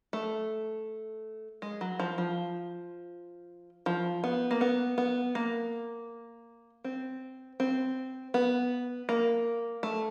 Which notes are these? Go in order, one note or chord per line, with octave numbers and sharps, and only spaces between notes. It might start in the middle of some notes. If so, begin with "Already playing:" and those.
A3
G#3
F#3
F3
F3
F3
B3
A#3
B3
B3
A#3
C4
C4
B3
A#3
A3